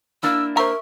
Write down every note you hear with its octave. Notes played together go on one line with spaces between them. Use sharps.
A#3 D4 E4 E6
A#4 C5 E5 A#5 C#6 E6